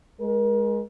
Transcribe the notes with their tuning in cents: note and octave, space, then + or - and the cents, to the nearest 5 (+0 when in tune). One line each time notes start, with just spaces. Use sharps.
G#3 +0 A#4 +35